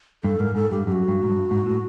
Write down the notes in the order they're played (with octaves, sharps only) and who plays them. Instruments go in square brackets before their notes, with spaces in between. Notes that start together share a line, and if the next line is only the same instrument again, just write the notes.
[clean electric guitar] G2 [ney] A4
[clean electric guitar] G#2 [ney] A#4
[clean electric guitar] G#2 [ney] A4
[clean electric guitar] G2 [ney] G4
[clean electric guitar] F#2 [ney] G4
[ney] F#4
[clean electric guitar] G2
G#2
G2
G#2
A2